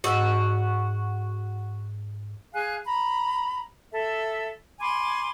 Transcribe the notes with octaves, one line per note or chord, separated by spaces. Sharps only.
G#2 F#4 D#5 E6
G#4 F5 G#5 F#6
A#5 B5
A4 E5
G#5 B5 C6 D6